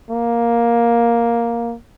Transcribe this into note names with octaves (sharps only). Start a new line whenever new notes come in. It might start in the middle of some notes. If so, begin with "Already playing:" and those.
A#3